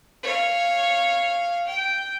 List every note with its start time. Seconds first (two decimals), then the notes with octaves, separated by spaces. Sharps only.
0.23 C#5 F5
1.68 G5